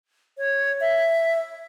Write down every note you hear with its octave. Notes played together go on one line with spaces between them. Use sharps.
C#5
E5